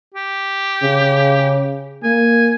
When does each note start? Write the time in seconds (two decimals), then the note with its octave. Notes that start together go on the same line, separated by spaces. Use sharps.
0.14 G4
0.83 C#3
2.03 A#3 G#5